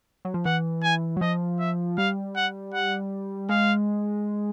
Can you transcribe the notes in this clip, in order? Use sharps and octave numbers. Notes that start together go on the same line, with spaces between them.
F#3
F3
E3 F#5
G#5
F#3
F3 D#5
E5
G3 F5
F#5
F#5
G#3 F5